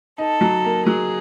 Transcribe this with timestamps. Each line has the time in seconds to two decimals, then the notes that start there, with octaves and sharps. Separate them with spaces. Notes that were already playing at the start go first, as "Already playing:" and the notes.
0.18 D#4 A4
0.41 F#3
0.65 A#3
0.86 F#3 G#4